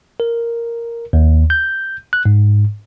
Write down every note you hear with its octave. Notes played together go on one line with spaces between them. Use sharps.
A#4
D#2
G6
F#6
G#2